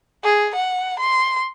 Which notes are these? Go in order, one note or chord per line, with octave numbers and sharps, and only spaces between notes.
G#4
F#5
C6